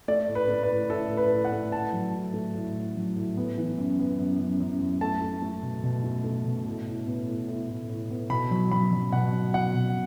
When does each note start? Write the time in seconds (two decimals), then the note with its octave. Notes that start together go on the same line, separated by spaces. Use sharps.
0.08 A3 D5
0.28 A2
0.35 B4
0.49 A3
0.63 B4
0.69 A2
0.90 A2 A4
1.11 A2
1.17 B4
1.31 A2
1.45 F#5
1.52 A3
1.72 A2 A5
1.93 F#3
2.13 A2
2.34 A3
2.54 A2
2.75 A2
2.96 F#3
3.16 A2
3.37 B3
3.58 E3
3.78 F#2
3.99 B3
4.19 F#2
4.39 F#2
4.60 F#2
4.80 F#2
5.01 A3 A5
5.22 A3
5.42 A3
5.63 B2
5.84 B2
6.04 A3
6.24 A3
6.45 B2
6.66 A2
6.87 A2
7.07 B3
7.28 A2
7.48 A2
7.69 A2
7.89 A2
8.10 B3
8.30 B2 B5
8.51 F#3
8.71 F#3 B5
8.92 F#3
9.12 B2 F#5
9.33 F#3
9.54 B2 F#5
9.75 B2